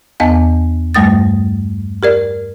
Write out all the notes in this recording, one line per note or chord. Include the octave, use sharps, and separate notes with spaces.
E2 B3 D#5 G#5 A5
G2 G3 A3 D#6 A6
G4 A#4 D5